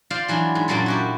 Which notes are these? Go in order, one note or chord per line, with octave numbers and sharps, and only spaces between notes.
F4 C5 D5 F5
E3 F#3 D4 E4
G#2
F#2 A#2 F#3 A#3 A4
E4 F#4 G4